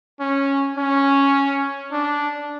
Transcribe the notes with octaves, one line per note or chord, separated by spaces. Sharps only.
C#4
C#4
D4